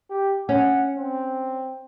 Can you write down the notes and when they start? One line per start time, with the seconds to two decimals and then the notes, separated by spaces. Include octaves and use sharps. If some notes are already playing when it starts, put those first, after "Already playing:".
0.10 G4
0.49 C#4 F#5
0.97 C4